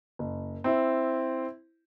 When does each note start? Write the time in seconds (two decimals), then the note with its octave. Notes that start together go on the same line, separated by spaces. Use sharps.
0.19 F#1
0.64 C4 E4